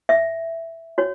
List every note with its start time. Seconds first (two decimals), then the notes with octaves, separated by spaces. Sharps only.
0.09 E5
0.98 F#4 C#5